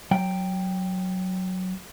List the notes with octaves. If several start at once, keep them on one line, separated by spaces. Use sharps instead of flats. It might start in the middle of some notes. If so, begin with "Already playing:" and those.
F#3 G5